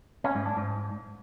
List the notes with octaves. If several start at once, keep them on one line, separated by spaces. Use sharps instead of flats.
C#4
G#2
D4
G#2